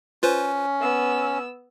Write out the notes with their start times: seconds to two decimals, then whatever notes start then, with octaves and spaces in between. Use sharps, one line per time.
0.23 C#4 F4 B4 C5
0.81 B3 E6